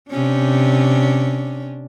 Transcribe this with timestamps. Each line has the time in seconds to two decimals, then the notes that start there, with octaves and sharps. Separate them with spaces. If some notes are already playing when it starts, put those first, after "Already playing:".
0.10 C3 C#4 D4